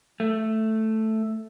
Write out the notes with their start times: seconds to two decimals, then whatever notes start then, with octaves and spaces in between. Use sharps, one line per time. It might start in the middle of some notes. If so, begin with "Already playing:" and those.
0.20 A3